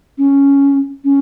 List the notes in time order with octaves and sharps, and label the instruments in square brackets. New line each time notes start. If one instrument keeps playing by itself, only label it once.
[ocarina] C#4
C#4